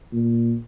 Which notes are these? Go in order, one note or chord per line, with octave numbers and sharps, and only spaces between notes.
A#2